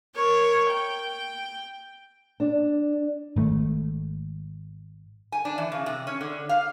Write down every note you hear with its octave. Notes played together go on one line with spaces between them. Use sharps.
A#4 C#5
G5
D4
G#1 A3
G#5
D4
E3
C#3
C3
C#4
D3
F5